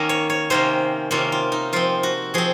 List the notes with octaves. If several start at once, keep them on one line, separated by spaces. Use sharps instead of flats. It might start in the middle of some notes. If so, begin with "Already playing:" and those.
Already playing: D#3 A#3 C#4 D#5
C#5
C#5
C3 D#3 A#3 C#4 C5
C3 D#3 A#3 C#4 F4
F4
D#4
F3 C4 F4
F#4
F3 C4 G#4